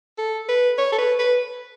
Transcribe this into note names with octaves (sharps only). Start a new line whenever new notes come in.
A4
B4
C#5
A4
B4
B4